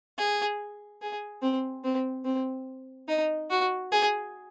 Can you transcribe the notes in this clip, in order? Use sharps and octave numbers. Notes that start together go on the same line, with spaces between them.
G#4
G#4
C4
C4
C4
D#4
F#4
G#4